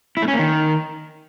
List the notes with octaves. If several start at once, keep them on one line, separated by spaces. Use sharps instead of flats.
E4
A3
C#4
A#3
D#3